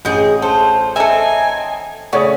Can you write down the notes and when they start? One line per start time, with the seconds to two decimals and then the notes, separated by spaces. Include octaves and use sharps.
0.05 A1 G#3 G#4 G6 C#7
0.42 F4 A4 C5
0.96 C4 D#4 A4 E5 G#5
2.13 C#3 A3 F#4 C#5 D5 D#6